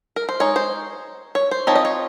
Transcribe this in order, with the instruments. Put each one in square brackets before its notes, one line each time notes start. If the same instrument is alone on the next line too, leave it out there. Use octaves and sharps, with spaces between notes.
[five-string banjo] A#4
C5
G#3 D#4 C#5
C5
C#5
C5
F3 C4 D#4 C#5
D#5
C#5